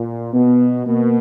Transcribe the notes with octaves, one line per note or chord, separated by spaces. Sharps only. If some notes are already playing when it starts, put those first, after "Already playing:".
Already playing: A#2
B2 B3
B2 A#3